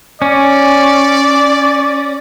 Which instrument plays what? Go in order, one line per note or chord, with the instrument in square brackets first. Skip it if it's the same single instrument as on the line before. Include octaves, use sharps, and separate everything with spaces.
[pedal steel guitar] C#4 [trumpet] D5